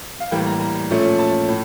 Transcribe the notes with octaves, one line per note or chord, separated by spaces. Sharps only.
F5
A2 E3 G3 A#3 G5
A#5
A#5
A#2 F3 A3 C#4
A5
A2